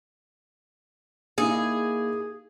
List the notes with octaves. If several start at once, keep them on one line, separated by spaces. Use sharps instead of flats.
A#3 D#4 E4 G#4